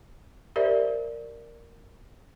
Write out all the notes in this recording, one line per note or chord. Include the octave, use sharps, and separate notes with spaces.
G4 A#4 C5 D5 E5